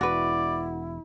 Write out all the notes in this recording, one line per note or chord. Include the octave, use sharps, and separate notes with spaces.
E1 E4 F#4 B4 D5